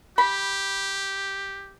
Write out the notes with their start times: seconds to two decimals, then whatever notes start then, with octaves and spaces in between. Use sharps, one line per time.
0.18 G4 B5